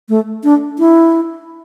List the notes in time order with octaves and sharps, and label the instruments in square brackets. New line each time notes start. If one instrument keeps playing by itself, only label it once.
[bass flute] A3
D4
E4